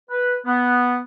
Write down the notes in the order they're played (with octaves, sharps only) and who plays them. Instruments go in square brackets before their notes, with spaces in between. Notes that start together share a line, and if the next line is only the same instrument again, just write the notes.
[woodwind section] B4
B3